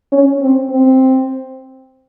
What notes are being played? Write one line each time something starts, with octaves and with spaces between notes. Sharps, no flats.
C#4
C4
C4